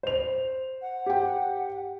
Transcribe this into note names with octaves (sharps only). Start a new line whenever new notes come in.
C5 F7
F#5
G4 G5